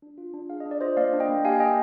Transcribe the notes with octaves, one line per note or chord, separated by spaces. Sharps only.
D4
F4
D4
G#4 F5
D#5
D4
D5
F4 C5 D#5
A#3 D5 F5
D4
D#5 G5
A#3
G4 F5 G#5
A#3 D#5 G5